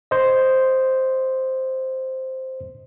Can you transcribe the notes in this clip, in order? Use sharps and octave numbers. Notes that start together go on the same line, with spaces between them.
C5 D#5